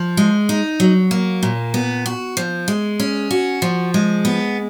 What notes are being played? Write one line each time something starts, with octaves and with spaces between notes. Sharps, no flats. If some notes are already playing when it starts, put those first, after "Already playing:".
Already playing: F3
G#3
D#4
F#3
A#3
A#2
B3
F#4
F3
G#3
C#4
F#4
F3
G#3
B3